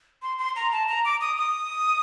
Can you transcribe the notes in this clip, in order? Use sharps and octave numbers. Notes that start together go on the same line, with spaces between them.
C6
C6
A#5
A5
A#5
D6
D#6
D#6